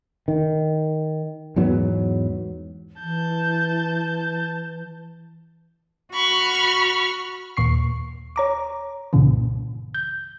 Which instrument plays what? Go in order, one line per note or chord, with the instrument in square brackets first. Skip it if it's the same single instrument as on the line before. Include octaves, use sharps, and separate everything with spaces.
[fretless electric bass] D#3
E2 G#2 F#3 B3
[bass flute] E3 [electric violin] A5 G6
[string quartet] F#4 B5 C#6 F6
[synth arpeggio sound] D#2 A#2 C#6 C7
C#5 A#5 D6
C2 G2 A#2 C#3 E3
G6